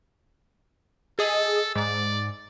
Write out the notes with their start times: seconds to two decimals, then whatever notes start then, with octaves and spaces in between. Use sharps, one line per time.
1.19 G#4 A4 D#5
1.76 G#2 D5